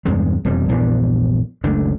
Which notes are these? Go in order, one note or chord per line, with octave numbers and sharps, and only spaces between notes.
E2 G2 C3 G#3
E1 F2 G3
A#1 E2 G2
F#1 C#2 A3 D4